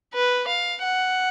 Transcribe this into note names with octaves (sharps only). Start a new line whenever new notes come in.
B4
F5
F#5